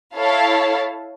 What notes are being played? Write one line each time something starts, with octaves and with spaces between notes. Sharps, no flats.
E4 A4 C#5 F5 A5